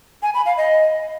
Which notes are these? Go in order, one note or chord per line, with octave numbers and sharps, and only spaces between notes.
G#5
B5
F5
D#5